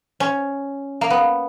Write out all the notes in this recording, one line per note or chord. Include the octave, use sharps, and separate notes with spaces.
C#4
A#3
B3